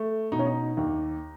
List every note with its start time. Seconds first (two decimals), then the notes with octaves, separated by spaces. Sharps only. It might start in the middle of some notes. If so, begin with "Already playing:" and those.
Already playing: A3
0.32 B2 D#4
0.39 C#4
0.46 D#4
0.77 D#2